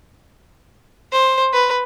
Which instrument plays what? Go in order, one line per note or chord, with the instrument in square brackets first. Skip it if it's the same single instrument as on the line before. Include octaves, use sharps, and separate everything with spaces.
[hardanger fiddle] C5
B4